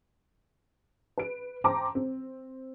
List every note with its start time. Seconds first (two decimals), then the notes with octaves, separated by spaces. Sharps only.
1.18 B4 D7
1.64 C5 G5 A5 A#5 C6 D6
1.95 C4